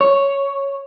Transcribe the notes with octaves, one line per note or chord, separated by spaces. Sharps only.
C#5